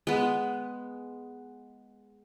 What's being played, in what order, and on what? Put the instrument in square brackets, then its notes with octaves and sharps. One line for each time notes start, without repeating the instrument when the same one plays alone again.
[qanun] G#3 B3